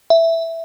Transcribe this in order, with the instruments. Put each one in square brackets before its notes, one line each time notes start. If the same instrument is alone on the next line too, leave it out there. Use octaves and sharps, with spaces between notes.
[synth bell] E5